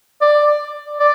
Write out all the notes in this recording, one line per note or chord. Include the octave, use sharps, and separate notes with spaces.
D5
D5